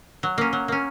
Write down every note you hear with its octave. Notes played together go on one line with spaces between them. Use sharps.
F#3
A#3 C#4
F#3
A#3 C#4